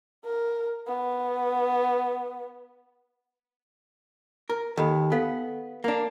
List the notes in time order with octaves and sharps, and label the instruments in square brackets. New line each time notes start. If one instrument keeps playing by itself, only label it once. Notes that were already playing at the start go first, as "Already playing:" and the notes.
[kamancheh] A#4
B3
[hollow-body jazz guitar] A#4
[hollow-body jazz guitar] D#2 [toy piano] A4 D#5 B5
[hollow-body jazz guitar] B3 [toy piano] A4 F5 F#5
[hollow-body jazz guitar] A#3 D4